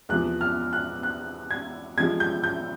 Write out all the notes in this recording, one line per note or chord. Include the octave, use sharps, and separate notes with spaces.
E2 C3 F3 F#6
F6
F#6
F#6
G#6
C2 C3 F3 G#3 G#6
G6
G6